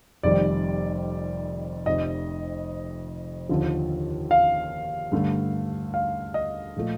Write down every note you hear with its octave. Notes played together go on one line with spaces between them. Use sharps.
F1 F2 D#3 G3 D5
F1 F2 C3 D#5
D#2 D3 F3
F5
G2 D3 A3
F5
D#5
A#2 F3 A3